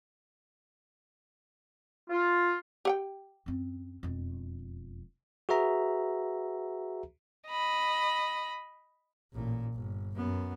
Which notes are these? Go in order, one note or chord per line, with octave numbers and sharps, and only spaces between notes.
F4
G4 F#5 G5
F#2 C4
E1 F2
F#4 G#4 B4 E5 A#5
D#5 B5
A1 A#2
G1
F#2 B3